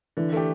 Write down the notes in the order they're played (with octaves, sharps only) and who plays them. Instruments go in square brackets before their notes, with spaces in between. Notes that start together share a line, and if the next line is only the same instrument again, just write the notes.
[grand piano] D3 [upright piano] E3
[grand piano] A3 G4